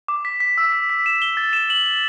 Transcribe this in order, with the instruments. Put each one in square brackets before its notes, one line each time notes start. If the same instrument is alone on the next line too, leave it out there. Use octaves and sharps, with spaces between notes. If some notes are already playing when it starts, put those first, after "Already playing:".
[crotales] D6
B6
B6
E6
B6
B6
E7
G7
A6
E7
F#7
F#7